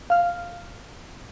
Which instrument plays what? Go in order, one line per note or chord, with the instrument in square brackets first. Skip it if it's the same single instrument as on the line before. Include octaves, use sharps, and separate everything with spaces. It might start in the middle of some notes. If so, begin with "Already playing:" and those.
[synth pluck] F5 F6